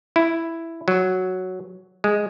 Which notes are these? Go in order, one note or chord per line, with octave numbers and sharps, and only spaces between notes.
E4
F#3
G#3